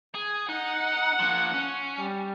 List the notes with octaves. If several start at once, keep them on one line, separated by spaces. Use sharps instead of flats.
G#4 G#5
D#4 F#5
F3 A#3
C#4
G3